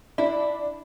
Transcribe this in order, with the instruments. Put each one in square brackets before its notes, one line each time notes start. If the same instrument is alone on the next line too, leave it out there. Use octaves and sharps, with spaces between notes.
[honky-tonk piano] D4 [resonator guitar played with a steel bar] E4